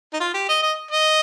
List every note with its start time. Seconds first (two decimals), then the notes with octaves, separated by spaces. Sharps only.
0.14 D#4
0.20 F4
0.34 G4
0.49 D#5
0.62 D#5
0.91 D#5